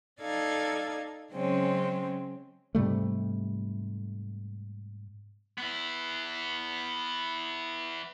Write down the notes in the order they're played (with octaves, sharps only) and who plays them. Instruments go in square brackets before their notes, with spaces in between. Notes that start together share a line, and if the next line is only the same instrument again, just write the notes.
[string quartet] D#4 A4 D5 F5 G#6
C#3 F#3 G#3 C4 C#4
[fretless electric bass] G#2 C3 G3 A3
[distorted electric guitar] B3 E4